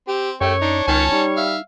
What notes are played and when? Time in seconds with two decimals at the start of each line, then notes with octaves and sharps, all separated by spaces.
0.08 C4 G4
0.41 F#2 A3 G4 C#5
0.61 D4 D#4
0.88 C#2 D#3 C#4 A5
1.12 G3 D#4
1.37 E5 F5